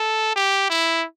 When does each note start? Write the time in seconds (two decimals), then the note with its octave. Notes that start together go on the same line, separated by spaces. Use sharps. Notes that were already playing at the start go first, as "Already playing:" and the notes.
Already playing: A4
0.36 G4
0.70 E4